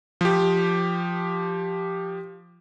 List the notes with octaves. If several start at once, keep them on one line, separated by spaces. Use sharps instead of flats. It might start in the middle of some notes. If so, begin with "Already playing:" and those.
F3 G4